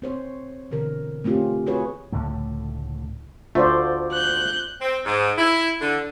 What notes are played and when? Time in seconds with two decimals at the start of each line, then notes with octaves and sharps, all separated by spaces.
0.02 C4 C5 C#5
0.71 B2 D3 E3 A#4
1.24 A3 C4 C#4 F4 G4
1.66 F4 F#4 G#4 B4 C#5
2.12 C#2 A2 D3 A3
3.55 D2 A3 F4 C5 D5
4.12 F#6 G6
4.81 C4
5.04 G#2
5.36 E4
5.80 D3